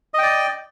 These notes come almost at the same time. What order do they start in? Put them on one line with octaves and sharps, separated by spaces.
D#5 G5 D5